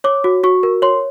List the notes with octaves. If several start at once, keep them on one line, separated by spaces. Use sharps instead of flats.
C#5 D6
F#4
F#4 C#6
A#4
C#5 C6